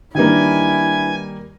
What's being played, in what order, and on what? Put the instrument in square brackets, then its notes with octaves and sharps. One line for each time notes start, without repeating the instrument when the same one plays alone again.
[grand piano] D#3 G3 A#3 [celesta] D4 B4 [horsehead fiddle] E4 [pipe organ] G#5